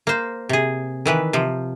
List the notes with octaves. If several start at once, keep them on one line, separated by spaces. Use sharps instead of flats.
A#3 C5
C3 G#4
D#3 E3 B4
C3 F3